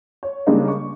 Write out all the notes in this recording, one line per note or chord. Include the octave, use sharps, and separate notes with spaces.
C#5
C#3 G3 G#3 A#3 D4 D#4
C#6